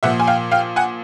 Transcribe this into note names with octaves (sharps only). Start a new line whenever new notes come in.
A#2 F3 E5 F#5
G#5
F5 G5
F5 G5
F#5 G#5